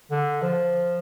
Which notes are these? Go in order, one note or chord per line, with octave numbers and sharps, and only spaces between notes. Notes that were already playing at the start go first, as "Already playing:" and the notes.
D3
F3